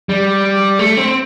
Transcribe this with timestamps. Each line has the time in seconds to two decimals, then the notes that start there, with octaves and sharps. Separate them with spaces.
0.09 G3
0.79 A3
0.97 C4